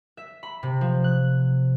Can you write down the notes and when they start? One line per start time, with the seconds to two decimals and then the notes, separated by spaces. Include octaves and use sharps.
0.17 E5
0.43 B5
0.63 C3
0.81 F3
1.04 F#6